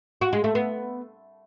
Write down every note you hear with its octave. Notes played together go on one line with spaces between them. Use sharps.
F#4
G#3
A3
B3